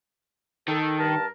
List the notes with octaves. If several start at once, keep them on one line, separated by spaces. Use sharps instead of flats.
D#3 A4
G2 A#4 A5